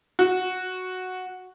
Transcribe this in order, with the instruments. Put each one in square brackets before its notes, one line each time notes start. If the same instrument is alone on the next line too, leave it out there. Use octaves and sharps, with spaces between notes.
[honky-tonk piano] F#4